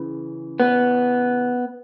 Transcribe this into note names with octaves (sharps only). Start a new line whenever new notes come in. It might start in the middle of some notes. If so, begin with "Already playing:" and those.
Already playing: C#3 E3
B3